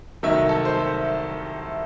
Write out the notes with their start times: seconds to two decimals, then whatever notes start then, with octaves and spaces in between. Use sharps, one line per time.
0.23 C2 C3 D#3 F#3 A3 E5
0.49 A4
0.65 C5
0.75 A4